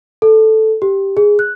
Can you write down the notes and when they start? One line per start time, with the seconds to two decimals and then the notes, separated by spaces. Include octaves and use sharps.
0.22 A4
0.82 G4
1.17 G#4
1.39 F#6